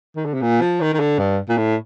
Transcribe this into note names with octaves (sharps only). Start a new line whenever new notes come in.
D#3
D3
C3
A#2
F3
D#3
D#3
D3
G2
A#2
A2